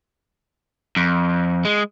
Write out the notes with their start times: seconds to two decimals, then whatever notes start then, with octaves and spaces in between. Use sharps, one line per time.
0.96 F2
1.65 G#3